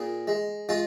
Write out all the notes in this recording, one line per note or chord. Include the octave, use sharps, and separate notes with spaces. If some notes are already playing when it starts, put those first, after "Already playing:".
Already playing: A#2 G#4
G#3
G#3 F4